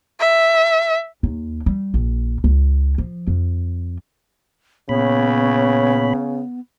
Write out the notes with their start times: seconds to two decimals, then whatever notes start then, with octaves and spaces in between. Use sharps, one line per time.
0.21 E5
1.23 D#2
1.66 G3
1.94 A#1
2.44 C#2
2.98 F3
3.27 F2
4.89 A#2 C#3 B3 C#5 B5